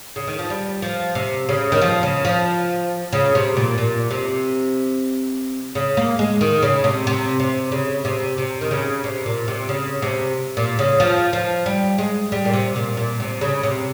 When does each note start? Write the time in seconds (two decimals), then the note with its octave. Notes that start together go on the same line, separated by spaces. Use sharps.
0.16 C#3
0.27 D#3
0.39 F3
0.50 G3
0.82 F3
1.15 C3
1.49 C#3
1.72 D#3
1.82 F3
2.03 C#3
2.25 F3
3.13 C#3
3.35 C3
3.57 A#2
3.78 A#2
4.11 C3
5.75 C#3
5.97 A#3
6.19 G#3
6.41 D#3
6.63 C#3
6.84 C3
7.07 C3
7.40 C3
7.72 C#3
8.05 C3
8.38 C3
8.61 D#3
8.71 C#3
9.04 C3
9.26 A#2
9.48 C3
9.69 C#3
10.02 C3
10.57 A#2
10.79 C#3
11.00 F3
11.33 F3
11.66 G3
11.98 G#3
12.32 G3
12.45 A#2
12.54 C3
12.76 A#2
12.97 A#2
13.20 C3
13.41 C#3
13.63 C3